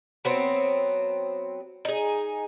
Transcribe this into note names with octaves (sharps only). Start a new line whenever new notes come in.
F#3 B3 C4
D#4 G#4